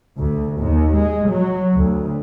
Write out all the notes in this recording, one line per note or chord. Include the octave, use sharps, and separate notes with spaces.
D2
D#2
G#3
F#3
D2